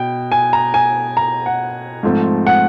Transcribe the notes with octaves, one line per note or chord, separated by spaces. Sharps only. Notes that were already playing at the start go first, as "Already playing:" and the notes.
Already playing: B2 G5
G#5
A#5
G#5
A#5
F#5
G#2 F3 A3 C4
F#5